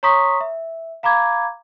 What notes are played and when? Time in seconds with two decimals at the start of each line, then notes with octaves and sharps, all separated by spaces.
0.03 C#5 A#5 C6 C#6 D#6 B6
0.41 E5
1.03 F5 A#5 B5 D6 G#6